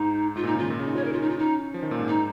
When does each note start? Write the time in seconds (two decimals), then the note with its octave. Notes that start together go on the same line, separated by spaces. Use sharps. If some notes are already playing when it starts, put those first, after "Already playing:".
Already playing: G#2 D#4
0.35 G#2 F4
0.44 A#2
0.47 D#4
0.53 C#3
0.59 D#3 F4
0.70 A#2
0.79 C#3
0.87 D#4
0.96 C#4 C#5
1.05 A#4
1.13 F4
1.22 D#4
1.30 F4
1.39 D#4
1.74 F3
1.83 D#3
1.91 A#2
1.99 G#2
2.08 D#4